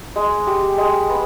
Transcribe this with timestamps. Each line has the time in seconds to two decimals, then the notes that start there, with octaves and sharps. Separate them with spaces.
0.16 G#3
0.47 G4
0.78 G#3
1.09 B3